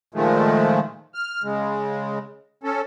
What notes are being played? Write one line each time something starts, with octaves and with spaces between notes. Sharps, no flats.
A#2 D#3 F3 G#3 A3
F6
C#3 G#3
C#4 A4